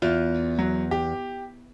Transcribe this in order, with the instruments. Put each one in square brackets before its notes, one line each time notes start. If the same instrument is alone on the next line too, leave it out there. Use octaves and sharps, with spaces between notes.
[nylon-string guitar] E2 [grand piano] F4
[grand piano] F#3
G4